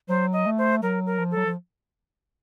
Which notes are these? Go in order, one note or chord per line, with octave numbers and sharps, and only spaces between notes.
F#3 C5
D#5
A3
C5
F#3 A#4
A#4
F3
A4
F#3
F3